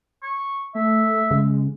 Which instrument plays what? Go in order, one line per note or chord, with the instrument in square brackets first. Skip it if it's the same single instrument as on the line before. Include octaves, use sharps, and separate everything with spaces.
[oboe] C#6
[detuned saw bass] A3 [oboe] E5
[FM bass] C#3 [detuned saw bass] G#3